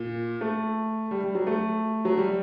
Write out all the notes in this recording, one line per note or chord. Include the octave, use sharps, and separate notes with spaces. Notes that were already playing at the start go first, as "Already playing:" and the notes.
Already playing: A#2
A3
G3
G3
F#3
A3
F#3
G3